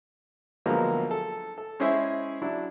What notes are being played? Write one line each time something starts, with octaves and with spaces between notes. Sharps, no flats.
D2 F3 F#3 G#3 A#3 B3
A4
A4
G#3 C#4 E4 G#4 C5 E5
F#3 D4 E4